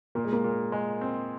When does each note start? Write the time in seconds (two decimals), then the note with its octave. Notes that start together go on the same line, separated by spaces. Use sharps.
0.15 A#2 A#3
0.25 G#3
0.33 A#3
0.44 A#2
0.72 G#3
1.01 C4